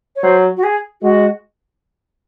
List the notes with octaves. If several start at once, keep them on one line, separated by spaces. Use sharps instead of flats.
C#5
F#3 C5
F#4
G#4
G#3 F#4